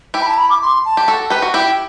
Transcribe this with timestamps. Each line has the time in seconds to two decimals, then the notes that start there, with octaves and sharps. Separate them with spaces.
0.14 E4 G4 G5
0.21 B5
0.26 A5
0.37 B5
0.49 D6
0.62 C6
0.85 A5
0.97 G4
1.08 F#4 A4
1.30 G4 B4
1.42 F#4
1.54 E4 G4 G5